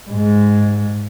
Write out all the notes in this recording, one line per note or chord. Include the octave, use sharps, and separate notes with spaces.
G#2 G#3